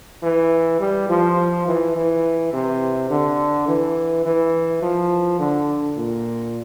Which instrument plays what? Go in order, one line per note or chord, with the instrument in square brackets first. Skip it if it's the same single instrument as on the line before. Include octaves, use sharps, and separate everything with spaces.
[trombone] E3
G3
F3
E3
E3
C3
D3
E3
E3
F3
D3
A#2